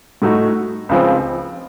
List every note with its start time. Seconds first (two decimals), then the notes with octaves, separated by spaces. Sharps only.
0.22 A2 A3 D#4 F#4
0.89 C#2 C#3 F3 C4